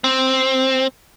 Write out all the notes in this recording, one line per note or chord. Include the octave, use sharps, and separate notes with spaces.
C4